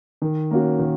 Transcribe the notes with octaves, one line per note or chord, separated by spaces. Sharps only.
D#3
A#3 C#4 F#4
D#3